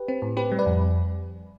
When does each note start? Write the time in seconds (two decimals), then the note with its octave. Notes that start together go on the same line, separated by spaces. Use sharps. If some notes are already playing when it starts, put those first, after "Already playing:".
Already playing: G4 B4
0.08 C4
0.22 A2
0.37 C4 G4 B4
0.52 G3
0.59 B4 D5
0.66 F2